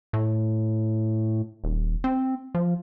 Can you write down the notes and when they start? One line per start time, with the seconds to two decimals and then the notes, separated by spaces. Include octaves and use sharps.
0.13 A2
1.64 D#1
2.04 C4
2.55 F3